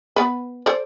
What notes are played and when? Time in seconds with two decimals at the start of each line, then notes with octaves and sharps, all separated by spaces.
0.16 B3 B4
0.66 A4 C5 D5